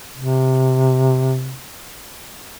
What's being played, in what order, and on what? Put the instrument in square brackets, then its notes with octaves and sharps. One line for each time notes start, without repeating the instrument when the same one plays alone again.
[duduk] C3